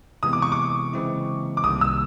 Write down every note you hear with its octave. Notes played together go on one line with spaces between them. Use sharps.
C3 E3 G#3 B3 D#6
D6
C#6
D6
C#3 E3 G#3 C4 E4
D6
C2 C3 D#3 G3 A#3 D#6
E6